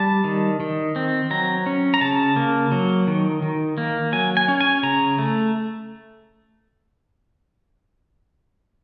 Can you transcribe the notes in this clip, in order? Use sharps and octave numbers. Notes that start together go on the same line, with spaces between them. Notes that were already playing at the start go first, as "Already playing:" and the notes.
Already playing: G3 A5
D#3
D#3
C4
F#3 A#5
C#4
A#5
C#3 A5
A#3
F#3
D#3
D#3
A#3
F#3 G#5
G#5
C#4
G#5
C#3 A#5
A3